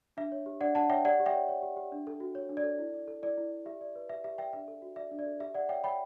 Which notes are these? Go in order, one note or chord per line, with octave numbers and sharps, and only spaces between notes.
D4 E5
C#5
G4
D4 D5 F#5
D4 F#5 A5
C#5 E5 G5
G4 D5 F#5
G4
E5 G5
C#5
C#5
G4
G4
D4
A4
F#4
C#5
D4
D5
A4
E4
D5
A4
E4 D5
E4
D5
G4 E5
D5
B4
G4 E5
G4 E5
D5 E5 G5
D4 E5
A4
F#4
D5 E5
D4
D5
A4
G4 E5
G4 D5 F#5
C#5 E5 G5
C#5 G5 B5